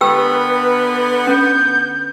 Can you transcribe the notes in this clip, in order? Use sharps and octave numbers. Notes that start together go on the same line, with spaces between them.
D3 B3 G4 A#4 B4 G5 E6
C#4 G6